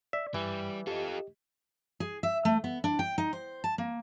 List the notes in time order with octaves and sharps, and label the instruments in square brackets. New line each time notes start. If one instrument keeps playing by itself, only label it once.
[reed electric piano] D5 [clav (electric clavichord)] E5
[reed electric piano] G2 [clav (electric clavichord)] E3 [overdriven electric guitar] G3
[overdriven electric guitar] F4 A4 [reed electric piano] G4 D#5
[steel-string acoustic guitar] G#4
E5
A3
B3
D4
G5
D#4
C5
A5
A#3